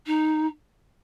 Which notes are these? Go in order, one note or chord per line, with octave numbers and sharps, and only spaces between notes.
D#4